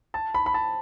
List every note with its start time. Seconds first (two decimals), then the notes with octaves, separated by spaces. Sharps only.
0.14 A5
0.34 B5
0.46 B5
0.54 A5